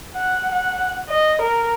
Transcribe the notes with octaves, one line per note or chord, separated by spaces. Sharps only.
F#5
F#5
D#5
A#4